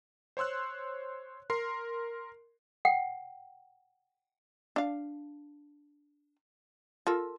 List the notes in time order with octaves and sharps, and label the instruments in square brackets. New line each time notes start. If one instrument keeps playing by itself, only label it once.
[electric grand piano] C5 C#5 C6 E6 F#6
A#4 C6 C7
[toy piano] F#5 G5
[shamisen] D4 F5
F4 A4 A#4